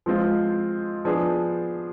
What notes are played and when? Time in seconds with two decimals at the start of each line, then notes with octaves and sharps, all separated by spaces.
0.06 F3 G#3 C4 F4
1.05 F3 B3 D4 G#4